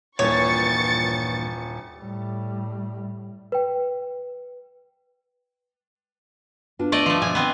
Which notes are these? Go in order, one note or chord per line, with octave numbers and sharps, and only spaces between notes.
D#1 G2 A#2 E3 C#5 C#6 A6 C#7
A2 G3
B4 G5
B3 D4 F4
A3 D5 D#5
F3 A3
B2 E5 G#5
B3 C4